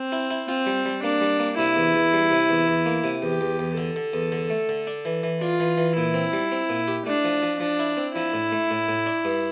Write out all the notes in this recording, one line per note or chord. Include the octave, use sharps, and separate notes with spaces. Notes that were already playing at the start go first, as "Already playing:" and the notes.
Already playing: C4
E4
E4
C4 F4
G3
G3
A#3 D4
G3
A#3
C3 E4
E2
E2
G3
C3
E2
E2
A#3
C3
E2 G4
E2
E2
D3 A4
D3
E2
D3
A3
D3
D4
E3
E3
D4 F4
E3
E3
A#2 E4
C4
G3
C4
A#2
G4
A3 D4
F3
F3
F3 D4
E4
C4
F3 E4
A2
A3
A2
A2
D4
G2